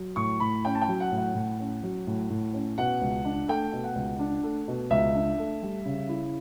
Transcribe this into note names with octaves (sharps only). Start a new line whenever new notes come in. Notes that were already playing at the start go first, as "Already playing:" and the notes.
Already playing: F#3
A2 C#6
A2 B5
C#4 G5
A5
G5
F#3
F#5
A2
F#5
A2
C#4
F#3
A2
A2
C#4
B2 F#5
C#2
D4
A3 G5
B2
F#5
C#2
D4
A3
B2
C#2 E5
D4
A3
G3
C#3
E4